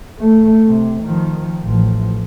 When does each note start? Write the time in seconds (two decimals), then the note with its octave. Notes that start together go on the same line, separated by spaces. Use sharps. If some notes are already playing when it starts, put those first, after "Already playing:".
0.20 A3
0.67 C3
1.03 D#3 F3
1.63 A1 F3